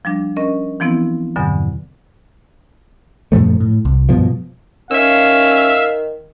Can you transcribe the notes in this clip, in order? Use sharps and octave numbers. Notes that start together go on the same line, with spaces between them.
F3 G3 D4
C#4 A#4 D#5
E3 F3 B3 C4 E4
E2 G2 B2 D3 F#3
F#2 A#2 F3 A3
A2
C2
G2 B2 F3
D#3 C#4 E5 F5 E6